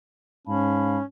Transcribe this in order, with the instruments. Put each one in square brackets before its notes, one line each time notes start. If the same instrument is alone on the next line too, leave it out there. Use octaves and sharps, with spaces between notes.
[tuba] G#2 [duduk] C#4 [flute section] F5 A5 B5